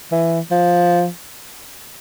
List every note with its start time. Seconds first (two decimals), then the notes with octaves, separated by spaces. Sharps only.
0.12 E3
0.51 F3